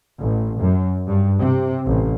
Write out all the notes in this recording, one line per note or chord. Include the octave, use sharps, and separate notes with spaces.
A1
F#2
G2
C3
A1